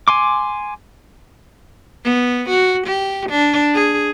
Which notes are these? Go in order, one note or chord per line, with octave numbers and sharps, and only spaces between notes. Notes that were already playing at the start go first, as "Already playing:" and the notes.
G#5 C6 D6
B3
F#4
G4
D4
G#4